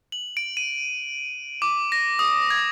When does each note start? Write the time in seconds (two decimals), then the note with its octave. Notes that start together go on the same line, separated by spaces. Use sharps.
0.12 F#7
0.37 D7
0.57 D#7
1.62 D6
1.92 A#6
2.19 D#6
2.50 G#6